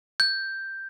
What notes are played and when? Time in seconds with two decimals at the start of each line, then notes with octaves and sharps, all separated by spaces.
0.20 G6